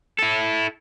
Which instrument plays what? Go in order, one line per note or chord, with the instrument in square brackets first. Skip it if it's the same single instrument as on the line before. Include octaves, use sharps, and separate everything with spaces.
[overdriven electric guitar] E4 A4